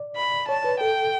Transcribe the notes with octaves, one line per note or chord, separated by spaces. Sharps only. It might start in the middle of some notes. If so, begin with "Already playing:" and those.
Already playing: D5
B5
C#5 A5
B4
A4 G5